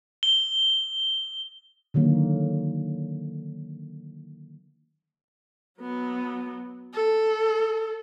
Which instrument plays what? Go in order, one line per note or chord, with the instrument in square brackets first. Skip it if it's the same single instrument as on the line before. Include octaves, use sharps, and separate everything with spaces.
[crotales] G7
[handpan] D3 D#3 F#3 A#3
[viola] F#3 B3
A4